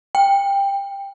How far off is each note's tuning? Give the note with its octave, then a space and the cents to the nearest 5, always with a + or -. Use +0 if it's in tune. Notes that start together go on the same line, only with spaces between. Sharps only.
G5 +20